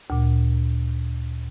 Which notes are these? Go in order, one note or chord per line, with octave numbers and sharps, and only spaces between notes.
D2 A#2